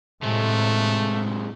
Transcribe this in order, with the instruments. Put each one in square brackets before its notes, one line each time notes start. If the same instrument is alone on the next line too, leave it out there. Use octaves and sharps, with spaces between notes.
[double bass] A2 [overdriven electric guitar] C3 G#3 [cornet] A3